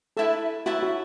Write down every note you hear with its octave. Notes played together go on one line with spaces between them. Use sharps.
E4 A4 B4 E5 A5
E4 F#4 B4 E5 A5
F#4